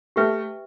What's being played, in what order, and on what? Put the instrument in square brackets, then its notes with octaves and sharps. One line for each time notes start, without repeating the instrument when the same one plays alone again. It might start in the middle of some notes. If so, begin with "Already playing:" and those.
[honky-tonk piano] A3 [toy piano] G4 B4 E5 G5